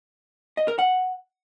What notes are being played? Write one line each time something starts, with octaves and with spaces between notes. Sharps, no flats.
D#5
A#4
F#5